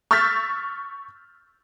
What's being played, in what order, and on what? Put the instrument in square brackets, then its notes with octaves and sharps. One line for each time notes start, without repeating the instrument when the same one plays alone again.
[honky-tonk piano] C#6 E6 F6 G6 A6 B6